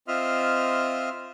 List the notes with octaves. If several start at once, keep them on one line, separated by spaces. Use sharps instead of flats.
C4 F4 D#5 E5 C6 F6